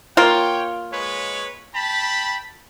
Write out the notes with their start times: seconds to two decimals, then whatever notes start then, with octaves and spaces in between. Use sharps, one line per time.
0.17 A#3 F4 C#5 G5
0.93 G#3 B4 C#5
1.75 G5 A5 B5